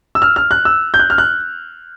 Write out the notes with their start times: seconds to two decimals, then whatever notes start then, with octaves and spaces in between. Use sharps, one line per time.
0.15 E6
0.22 F6
0.36 F6
0.51 F#6
0.65 E6
0.94 G6
0.99 F#6
1.10 F6
1.18 F#6